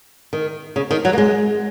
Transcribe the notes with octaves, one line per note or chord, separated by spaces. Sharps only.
D#3
C#3
D#3
F#3
A#3
G#3